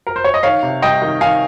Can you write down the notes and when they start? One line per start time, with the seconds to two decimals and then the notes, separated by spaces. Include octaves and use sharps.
0.07 A#4
0.16 C5
0.24 C#5
0.34 D#5
0.43 D#3 C#5 F5
0.63 C3
0.82 C2 D#5 G5
1.02 D#3
1.21 D#3 F5 G#5